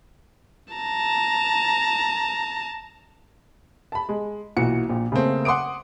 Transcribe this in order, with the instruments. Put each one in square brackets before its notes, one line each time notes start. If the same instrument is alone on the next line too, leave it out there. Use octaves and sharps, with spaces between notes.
[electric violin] A5 A#5
[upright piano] A5 B5
G#3
B1 A#2 E3 F#4 C#7
A#1 A#2
C#3 A3 A#3 C4
F#5 C6 D6 D#6 D7